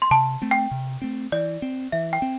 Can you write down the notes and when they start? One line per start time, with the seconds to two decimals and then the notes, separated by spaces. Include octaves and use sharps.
0.02 C6
0.11 C3 A5
0.42 A3 C4
0.51 G5
0.71 C3
1.02 A3 C4
1.32 E3 D5
1.62 C4
1.92 E3 E5
2.13 G5
2.22 C4